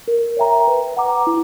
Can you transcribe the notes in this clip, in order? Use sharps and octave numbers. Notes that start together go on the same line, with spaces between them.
A#4
C#5 E5 G5 A#5
B4
F#5 A#5 D6
E4